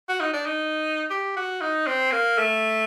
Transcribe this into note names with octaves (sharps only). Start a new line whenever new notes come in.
F#4
D#4
D4
D#4
G4
F#4
D#4
C4
A#3
A3